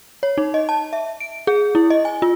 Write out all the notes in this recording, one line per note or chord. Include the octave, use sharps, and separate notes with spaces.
C#5
D#4
D#5
A5
E5
D7
G#4
E4
D#5
G#5
F4